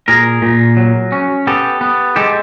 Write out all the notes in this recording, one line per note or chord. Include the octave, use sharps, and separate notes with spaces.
A#2 G#4 A#4
A#2
F#3
C#4
B3 G4 A4
B3
G#3 G4 A4